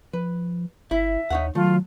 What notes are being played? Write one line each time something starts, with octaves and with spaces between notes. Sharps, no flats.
F3 B4
G1 E4 E5
D#2 D#4 C#5 F#5
D#3 F#3 A3 F4